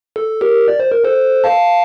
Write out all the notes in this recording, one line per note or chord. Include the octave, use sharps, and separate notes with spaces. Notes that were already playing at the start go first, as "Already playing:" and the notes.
A4
G4 A#4
D5
C5
A#4
A4 C5
F5 A5